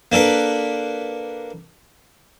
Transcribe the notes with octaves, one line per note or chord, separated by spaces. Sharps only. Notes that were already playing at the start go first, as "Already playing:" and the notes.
A#3 D4 A4 B4